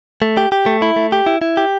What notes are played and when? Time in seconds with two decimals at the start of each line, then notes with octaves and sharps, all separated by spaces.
0.22 A3
0.37 G4
0.52 G4
0.66 A3
0.82 E4
0.96 A3
1.12 G4
1.26 E4
1.42 E4
1.57 G4